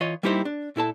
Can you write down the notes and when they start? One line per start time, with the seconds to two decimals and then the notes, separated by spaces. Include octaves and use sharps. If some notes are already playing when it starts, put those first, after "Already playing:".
0.01 E3 F4 C#5 D#5
0.23 G3 A#3 D#4 E4 G4 C5
0.45 D4
0.76 A#2 E4 A4 A5